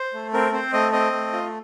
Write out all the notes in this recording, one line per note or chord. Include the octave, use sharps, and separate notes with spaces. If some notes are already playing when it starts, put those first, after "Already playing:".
Already playing: C5
A3
C4 A#4
C4 C5
A3 D#5
C4 D#5
A3
F4